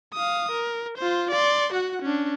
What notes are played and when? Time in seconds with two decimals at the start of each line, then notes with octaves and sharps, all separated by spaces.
0.14 F5 D#6
0.52 A#4
0.98 F4 C5
1.31 D5 C6
1.73 F#4 F#5
2.02 C#4 D4